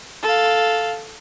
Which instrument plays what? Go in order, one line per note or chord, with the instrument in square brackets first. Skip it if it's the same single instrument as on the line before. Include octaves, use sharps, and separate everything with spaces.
[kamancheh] A4 F5